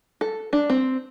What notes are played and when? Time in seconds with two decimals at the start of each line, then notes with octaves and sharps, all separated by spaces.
0.21 A4
0.53 D4
0.70 C4